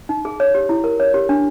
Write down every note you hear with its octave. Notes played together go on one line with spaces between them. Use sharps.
D#4
G#4
C#5
G4
E4
A#4
C#5
G4
D4